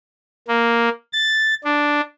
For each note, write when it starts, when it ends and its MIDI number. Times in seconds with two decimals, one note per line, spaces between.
0.48 0.89 58
1.13 1.54 93
1.64 2.01 62